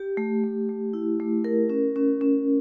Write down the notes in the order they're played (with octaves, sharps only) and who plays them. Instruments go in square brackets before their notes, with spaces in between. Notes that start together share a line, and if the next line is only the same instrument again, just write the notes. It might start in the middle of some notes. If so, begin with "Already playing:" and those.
Already playing: [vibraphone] G4
A3
A3
A3
E4
A3
A#4
C#4
C#4
C#4